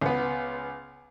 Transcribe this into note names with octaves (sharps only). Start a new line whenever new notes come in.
C#2 B3